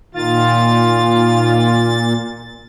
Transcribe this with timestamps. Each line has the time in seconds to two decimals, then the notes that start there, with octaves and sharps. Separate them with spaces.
0.15 A#2 D#3 F4 A6